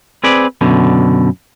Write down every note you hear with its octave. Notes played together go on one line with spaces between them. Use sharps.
C4 G#4 B4 D5
F#2 B2 D3